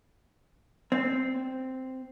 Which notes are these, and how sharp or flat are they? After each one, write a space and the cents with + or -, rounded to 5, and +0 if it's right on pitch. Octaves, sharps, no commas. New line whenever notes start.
C4 -5